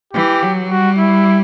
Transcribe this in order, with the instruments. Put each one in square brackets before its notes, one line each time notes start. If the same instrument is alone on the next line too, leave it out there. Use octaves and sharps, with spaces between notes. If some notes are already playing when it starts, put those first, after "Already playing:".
[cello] E3 [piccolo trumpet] G4
[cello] F#3
[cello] G3 [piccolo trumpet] F#4
[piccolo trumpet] E4